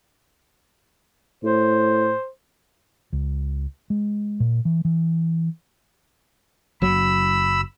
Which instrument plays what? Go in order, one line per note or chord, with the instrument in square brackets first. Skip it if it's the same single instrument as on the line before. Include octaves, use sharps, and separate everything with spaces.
[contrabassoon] A2 [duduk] C5
[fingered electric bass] C#2
G#3
A#2
E3
E3
[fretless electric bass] F#1 F#3 [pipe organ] B5 E6